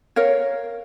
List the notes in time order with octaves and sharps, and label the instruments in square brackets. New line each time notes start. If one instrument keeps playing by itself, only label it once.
[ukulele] A#4 C#5 F5